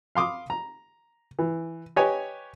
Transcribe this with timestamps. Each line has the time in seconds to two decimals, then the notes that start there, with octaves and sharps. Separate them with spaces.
0.15 F5 C6 D6 D#6
0.50 A#5
1.39 E3
1.96 G4 B4 C#5 D#5 G#5